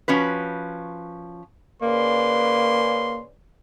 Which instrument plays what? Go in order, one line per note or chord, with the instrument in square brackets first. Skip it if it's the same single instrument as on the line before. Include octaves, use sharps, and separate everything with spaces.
[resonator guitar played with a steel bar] F3 C#4 F#4 B4
[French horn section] C#3 B4 D5 [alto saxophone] A#3 [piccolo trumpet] C6